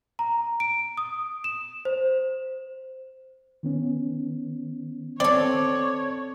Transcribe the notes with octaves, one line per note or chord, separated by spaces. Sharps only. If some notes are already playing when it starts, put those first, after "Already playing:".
A#5
D7
D#6
E7
C5
D#3 B3 C#4
C4 A4 C#5 D5